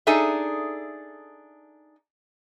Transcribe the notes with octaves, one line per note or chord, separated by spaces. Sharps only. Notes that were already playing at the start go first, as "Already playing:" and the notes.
D4 D#4 G#4 A4 E5